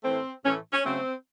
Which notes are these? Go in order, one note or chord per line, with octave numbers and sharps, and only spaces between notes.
A2 E3 A3 C4
A2 E3 A3 C#4
C#4
C#3 F#3 A3 C4